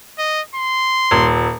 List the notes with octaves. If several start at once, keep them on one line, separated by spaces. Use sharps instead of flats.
D#5
C6
D#1